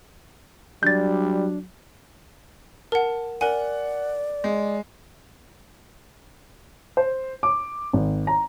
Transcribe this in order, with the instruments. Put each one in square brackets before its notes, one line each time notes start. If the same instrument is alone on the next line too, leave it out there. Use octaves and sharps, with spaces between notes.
[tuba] F#3 [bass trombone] G3 [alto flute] D4 [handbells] G6 A6
[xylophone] A#4 F#5 [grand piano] A5
[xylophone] A#4 G#5 [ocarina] D5 [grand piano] F#5
[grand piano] G#3
[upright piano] C5
D6
G#1
A#5